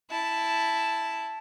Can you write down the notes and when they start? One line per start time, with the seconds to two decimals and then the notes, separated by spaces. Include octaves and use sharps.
0.10 E4 A5